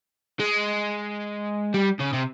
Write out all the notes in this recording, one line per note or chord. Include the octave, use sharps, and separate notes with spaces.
G#3
G3
C#3
C3